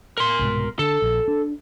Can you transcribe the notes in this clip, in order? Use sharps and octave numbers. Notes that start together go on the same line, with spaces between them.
A#4 C6
C2 G#2 B2
D3 A4
A#1
D4